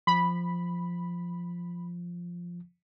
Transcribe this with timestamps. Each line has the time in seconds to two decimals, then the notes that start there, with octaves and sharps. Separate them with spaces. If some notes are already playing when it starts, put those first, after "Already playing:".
0.07 F3 B5